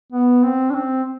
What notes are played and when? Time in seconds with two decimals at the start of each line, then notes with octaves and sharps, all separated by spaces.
0.12 B3
0.43 C4
0.70 D4
0.74 C4